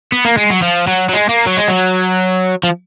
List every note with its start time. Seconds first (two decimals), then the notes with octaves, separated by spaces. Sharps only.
0.12 B3
0.25 A#3
0.37 G#3
0.50 F#3
0.62 F3
0.87 F#3
1.09 F#3
1.13 G#3
1.29 A#3
1.47 F#3
1.57 G#3
1.68 F#3
2.63 F3